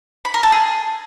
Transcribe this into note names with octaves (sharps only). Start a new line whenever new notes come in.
B5
A#4
A4
G#4